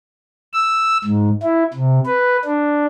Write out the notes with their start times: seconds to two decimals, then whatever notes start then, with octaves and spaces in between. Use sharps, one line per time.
0.53 E6
1.04 G#2
1.43 E4
1.73 C3
2.06 B4
2.45 D4